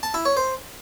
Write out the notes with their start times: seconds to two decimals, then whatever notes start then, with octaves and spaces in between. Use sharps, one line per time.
0.03 A5
0.14 E4
0.25 C#5
0.37 C5